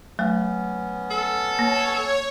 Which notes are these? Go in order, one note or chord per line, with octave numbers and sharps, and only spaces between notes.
F#3 A3 B3 C#4
A4
A#3 C#5